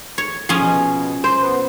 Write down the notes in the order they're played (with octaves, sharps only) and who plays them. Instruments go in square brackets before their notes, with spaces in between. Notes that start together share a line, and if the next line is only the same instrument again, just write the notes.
[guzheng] C#5
[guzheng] F3 C#4 [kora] G#4
[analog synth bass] B2
[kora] C5
[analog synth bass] B3